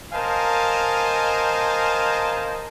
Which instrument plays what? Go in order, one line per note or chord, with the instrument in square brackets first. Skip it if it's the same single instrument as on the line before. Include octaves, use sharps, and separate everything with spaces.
[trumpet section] A#4 C5 D#5 F5 G#5 A5